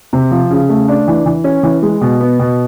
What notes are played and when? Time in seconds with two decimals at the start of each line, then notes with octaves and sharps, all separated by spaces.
0.13 C3
0.31 F3
0.50 C#3
0.69 A3
0.88 D4
1.08 E3
1.26 E3
1.44 C#4
1.63 E3
1.82 G#3
2.01 B2
2.20 B3
2.39 B2